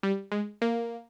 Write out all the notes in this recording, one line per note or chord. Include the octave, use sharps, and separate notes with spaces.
G3
G#3
A#3